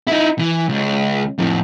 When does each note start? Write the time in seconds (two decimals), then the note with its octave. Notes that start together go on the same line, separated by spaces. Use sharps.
0.07 D#4 E4
0.39 E3
0.69 C#2
1.38 F2 A2